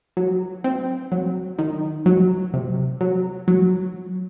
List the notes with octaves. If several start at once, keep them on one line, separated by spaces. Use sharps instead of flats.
F#3
C4
F#3
D#3
F#3
C3
F#3
F#3